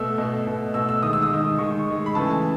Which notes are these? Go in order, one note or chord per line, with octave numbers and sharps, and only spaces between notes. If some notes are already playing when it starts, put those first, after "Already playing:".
Already playing: B2 A3 E6
B2 A3
B2 A3
B2 A3 E6
E6
D#3 G#3 D#6
E6
D#6
D#3 G#3
D#3 G#3 C#6
D#3 G#3
B5
C#3 E3 A3 A5